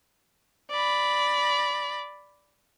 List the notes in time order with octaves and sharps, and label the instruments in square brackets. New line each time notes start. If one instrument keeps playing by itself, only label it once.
[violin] D5 B5